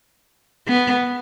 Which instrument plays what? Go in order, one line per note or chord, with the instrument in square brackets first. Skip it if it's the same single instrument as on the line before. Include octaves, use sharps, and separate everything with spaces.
[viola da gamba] B3